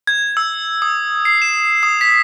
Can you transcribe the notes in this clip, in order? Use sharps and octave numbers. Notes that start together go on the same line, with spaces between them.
G#6
E6
D#6
C7
E7
D#6
B6